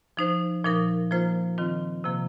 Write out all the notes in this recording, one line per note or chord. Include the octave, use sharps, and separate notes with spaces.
F3 D#4 C5
A#2 F3 D#4 A#4
F3 A#3 F4 C5
D#3 C4 F4
C3 F3 A#3